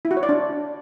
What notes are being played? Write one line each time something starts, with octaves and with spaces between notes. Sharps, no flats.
E4
F#4
C#5
D5
D4